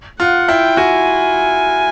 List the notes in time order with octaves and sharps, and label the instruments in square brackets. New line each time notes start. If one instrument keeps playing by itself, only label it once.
[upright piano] F4 [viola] F#5
[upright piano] E4 [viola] G5
[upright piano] F#4 [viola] G#5